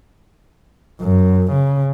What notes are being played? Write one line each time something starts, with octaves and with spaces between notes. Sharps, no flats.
F#2
C#3